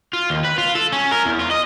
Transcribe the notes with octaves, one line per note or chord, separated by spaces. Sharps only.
F4
D#2
B4
F4
A4
C#4
A#4
E2
F4
D#5